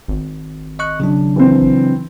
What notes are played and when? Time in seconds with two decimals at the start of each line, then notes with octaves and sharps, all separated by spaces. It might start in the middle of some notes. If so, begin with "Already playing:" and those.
0.08 G#1
0.79 D#5 C#6 F#6
1.00 C#3 F#3 D4
1.36 E3 C4